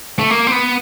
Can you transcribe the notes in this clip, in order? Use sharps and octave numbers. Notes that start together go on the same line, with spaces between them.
A3
A#3
C4
B3